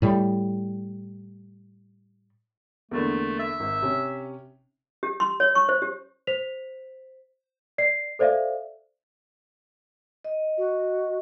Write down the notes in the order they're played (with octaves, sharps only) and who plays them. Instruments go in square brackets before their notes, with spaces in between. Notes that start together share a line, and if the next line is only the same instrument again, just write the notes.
[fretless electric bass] A2 G3
[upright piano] E2 D3 A#3 [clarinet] A3
[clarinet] E5
[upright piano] G#1
C3 C#4
[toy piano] G4
C6
C#5
C#6
C5
G4
[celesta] C5 B6 F7
D5 C7
A4 C5 D5 E5 F5
[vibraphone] D#5
[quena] F#4